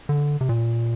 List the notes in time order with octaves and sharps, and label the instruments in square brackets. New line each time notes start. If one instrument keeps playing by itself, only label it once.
[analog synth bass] D3
C3
A#2